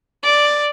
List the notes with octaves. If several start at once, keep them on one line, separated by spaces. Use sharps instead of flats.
D5